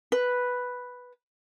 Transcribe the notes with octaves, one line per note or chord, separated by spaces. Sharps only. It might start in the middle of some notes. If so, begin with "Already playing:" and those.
B4